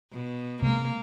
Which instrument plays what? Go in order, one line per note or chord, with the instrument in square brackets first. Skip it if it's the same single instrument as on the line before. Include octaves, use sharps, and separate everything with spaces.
[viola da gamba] B2
[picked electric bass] C3 G#3 [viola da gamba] A#3